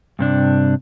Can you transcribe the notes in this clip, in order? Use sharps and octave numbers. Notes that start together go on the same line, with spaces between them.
G2 C3 D4